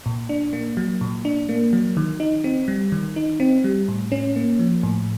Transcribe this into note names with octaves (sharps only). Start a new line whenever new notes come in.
A#2
D4
A#3
F#3
A#2
D4
A#3
F#3
D#3
D#4
C4
G3
D#3
D#4
C4
G3
A2
C#4
A#3
F3
A2